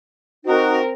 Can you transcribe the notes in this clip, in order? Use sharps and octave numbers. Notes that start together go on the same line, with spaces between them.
C4 D#4 F#4 A#4